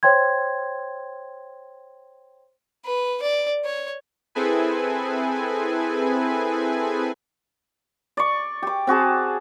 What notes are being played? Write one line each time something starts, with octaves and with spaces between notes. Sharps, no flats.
C5 C#5 G5 C6 G#6
B4
D5
C#5
C4 E4 G#4 A4 B4 G#5
D5 C#6
G4 D6
C4 F#4 G#4 A5